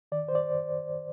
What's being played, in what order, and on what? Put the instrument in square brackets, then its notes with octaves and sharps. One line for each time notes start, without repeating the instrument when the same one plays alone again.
[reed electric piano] D#3 D5
C5
D5